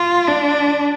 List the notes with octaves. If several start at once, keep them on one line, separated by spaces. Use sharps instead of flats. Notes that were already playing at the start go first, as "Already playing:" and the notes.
Already playing: F4
D4